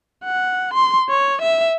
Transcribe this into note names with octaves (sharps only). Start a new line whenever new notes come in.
F#5
C6
C#5
E5